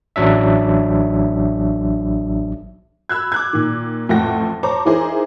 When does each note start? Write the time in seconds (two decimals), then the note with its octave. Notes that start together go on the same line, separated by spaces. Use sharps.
0.16 A1 F#3 D4 E5
3.09 B5 E6 F#6 G#6
3.32 D6 F#6 G#6
3.53 A#2 D#3
4.09 A1 F2 A3 F#5 G5 A#6
4.63 C5 C#5 A5 A#5 D6
4.85 E3 D#4 E4 G#4 A#4 C5